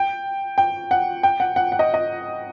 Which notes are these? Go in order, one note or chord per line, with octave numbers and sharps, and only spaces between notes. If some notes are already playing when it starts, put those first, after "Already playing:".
Already playing: G5
G5
F#5
G5
F#5
F#5
F#5
D#5
D#5